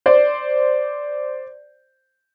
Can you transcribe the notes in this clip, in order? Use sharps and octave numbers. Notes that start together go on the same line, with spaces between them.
C5 D5